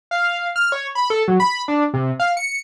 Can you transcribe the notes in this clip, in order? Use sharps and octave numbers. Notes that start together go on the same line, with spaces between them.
F5
F6
C#5
B5
A4
F#3
B5
D4
C3
F5
C#7